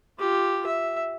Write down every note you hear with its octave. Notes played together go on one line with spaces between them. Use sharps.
F4 G4
E5